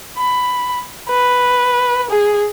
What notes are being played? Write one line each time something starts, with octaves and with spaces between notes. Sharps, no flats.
B5
B4
G#4